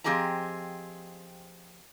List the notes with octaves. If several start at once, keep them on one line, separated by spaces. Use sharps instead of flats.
F3 C4 G4 G#4 D#5 A#5